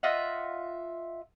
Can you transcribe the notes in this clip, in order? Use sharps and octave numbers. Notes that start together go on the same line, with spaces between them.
F4 D#5 E5 F#5